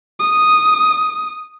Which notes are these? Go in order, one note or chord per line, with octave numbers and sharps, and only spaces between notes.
D#6